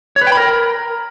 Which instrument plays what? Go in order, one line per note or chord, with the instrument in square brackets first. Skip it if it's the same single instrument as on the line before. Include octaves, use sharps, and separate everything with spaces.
[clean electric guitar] C#5
B4
G5
B5
A#4